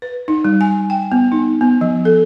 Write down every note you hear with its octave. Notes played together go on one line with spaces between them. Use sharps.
B4
D#4
G3
G#5
G5
B3
D#4
B3
F3
A4